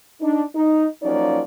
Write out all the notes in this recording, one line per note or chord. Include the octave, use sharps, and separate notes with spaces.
D4 D#4
D#4
F3 F#3 A#3 C#4 D#4 D5